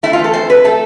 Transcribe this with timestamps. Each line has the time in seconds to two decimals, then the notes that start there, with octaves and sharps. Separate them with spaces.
0.03 A3 E4
0.13 F4
0.19 E3 A4
0.34 F2 C5
0.49 F2 B4
0.64 A3 A4